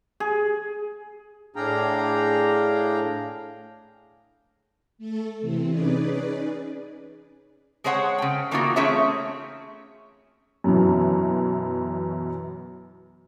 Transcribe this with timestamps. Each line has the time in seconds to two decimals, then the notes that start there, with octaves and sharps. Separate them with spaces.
0.20 G#4
1.56 A2 D4 G#4 F5 G5 A#5
4.98 A3 A4
5.41 C3 E3 C4
5.70 C#4 D#4 G#4 B4 D5
7.84 G#3 G#4 C5 C#5 F#5
8.18 C#3 G5
8.51 E3 A#3 B3 D#4 F4 F#4
8.76 A3 C4 C#4 G#4 C#5 E5
10.64 F#2 B2 E3